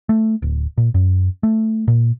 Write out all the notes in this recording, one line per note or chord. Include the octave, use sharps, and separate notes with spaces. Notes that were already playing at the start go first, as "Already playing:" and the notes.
A3
D1
A#2
F#2
A3
A#2